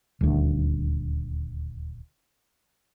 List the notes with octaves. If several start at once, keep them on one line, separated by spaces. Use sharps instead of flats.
D#1 D2